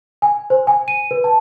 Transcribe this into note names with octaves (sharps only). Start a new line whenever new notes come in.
G#5
C5
G#5
D#7
B4
A5